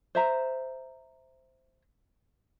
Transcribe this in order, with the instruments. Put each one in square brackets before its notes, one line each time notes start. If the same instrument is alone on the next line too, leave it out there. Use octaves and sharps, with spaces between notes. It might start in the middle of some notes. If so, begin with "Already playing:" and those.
[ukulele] C5 E5 A#5